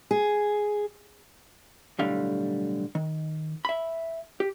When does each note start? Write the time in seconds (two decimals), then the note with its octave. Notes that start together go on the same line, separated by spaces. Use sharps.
0.11 G#4
1.99 B1 A2 D3 G3 F5
2.95 D#3
3.65 E5 B5
4.40 G4